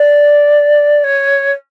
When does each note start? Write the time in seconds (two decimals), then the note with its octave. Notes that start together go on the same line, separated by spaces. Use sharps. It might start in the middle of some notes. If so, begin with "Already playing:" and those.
Already playing: D5
1.04 C#5